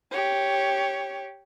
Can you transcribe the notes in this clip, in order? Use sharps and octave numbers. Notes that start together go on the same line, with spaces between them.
G4 C#5